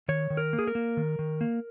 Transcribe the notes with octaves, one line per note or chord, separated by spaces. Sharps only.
D#3 C#5
D#3
A#4
A#3
G#4
A#4
A#3
D#3
D#3
A#3